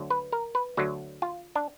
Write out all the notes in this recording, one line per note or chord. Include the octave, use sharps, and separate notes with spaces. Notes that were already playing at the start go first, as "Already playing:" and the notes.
Already playing: D2 D3 F#3
B4
A#4
B4
D2 D3 F#3 F#4
F4
D4